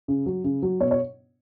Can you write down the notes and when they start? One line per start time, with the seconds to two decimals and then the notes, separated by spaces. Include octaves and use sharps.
0.08 C#3
0.26 F#3
0.44 C#3
0.62 F#3
0.80 B2 C#5
0.91 C#5